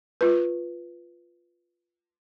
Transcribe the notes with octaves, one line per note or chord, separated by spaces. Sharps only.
F4 B4